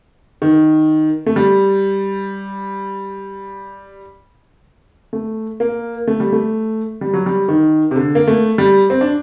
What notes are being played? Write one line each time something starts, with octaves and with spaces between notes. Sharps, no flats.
D#3
A3
G3
A3
A#3
A3
G3
A3
G3
F#3
G3
D#3
C3
D3
A#3
A3
G3
C4
D4